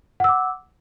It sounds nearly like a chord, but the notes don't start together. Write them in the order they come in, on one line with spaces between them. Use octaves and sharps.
F#5 E6 D6